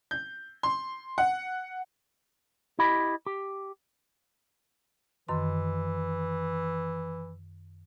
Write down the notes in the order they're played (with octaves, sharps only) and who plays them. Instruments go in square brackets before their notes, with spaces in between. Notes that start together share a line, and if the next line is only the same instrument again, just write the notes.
[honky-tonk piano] G6
C6
F#5
[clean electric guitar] E4 G4 D#5 B5
G4
[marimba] F#2 D#3 C6 [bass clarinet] E3